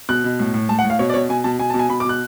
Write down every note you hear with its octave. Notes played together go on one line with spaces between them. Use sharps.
B2 F#6
B2
A2
A2
A2 A5
F#5
A2
F5
B2 C#5
D5
B2 C#5
B2 G#5
B2 A5
B2 G#5
B2 A5
G#5
B2 B5
D6
B2 F#6